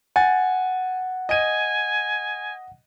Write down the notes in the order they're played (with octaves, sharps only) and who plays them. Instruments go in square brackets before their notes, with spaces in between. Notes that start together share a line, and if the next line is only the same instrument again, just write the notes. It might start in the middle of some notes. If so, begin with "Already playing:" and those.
[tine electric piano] F#5 [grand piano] G#5 A6
[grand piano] D#5 D#7 [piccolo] G#5